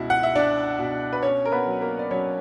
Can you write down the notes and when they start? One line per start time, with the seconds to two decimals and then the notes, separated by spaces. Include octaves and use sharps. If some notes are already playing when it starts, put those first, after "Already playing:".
Already playing: C#2 B2 E4
0.10 F#5
0.23 E5
0.35 D4 D5
0.79 B2
1.13 B4
1.23 C#4 C#5
1.45 A#4
1.52 B3 B4
1.66 F#3
1.81 A#3 A#4
1.99 D5
2.11 F#3 C#4 C#5